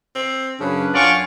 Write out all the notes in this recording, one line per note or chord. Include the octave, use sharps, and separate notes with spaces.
C4
F#2 C#3 C#4 D4 B4
F#2 C#4 F4 D5 F#5 G#5 C#6